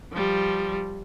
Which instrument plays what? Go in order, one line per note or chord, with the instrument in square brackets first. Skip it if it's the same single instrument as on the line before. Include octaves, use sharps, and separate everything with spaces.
[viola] F3 G3